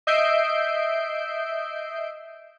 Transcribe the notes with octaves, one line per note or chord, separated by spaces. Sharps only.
D#5 E5 G6 C7 D7